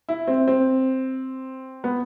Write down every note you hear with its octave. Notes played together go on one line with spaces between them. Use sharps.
E4
C4
C4
B3